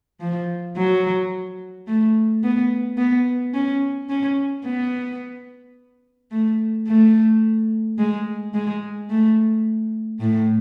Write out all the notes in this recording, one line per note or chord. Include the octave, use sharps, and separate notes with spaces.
F3
F#3
A3
B3
B3
C#4
C#4
B3
A3
A3
G#3
G#3
A3
A2